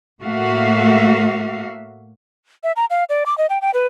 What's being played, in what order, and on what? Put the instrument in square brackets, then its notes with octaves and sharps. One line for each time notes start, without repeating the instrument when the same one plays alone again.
[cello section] A2 A3 A#3 F#4 E5 F5
[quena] E5
A#5
F5
D5
D6
D#5
G5
G5
B4